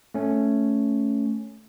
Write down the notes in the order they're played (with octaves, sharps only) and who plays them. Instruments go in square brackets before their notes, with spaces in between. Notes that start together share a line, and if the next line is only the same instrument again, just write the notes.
[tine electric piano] A3 C#4